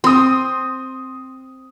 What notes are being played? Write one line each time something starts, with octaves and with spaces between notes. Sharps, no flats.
C4 C6 D#6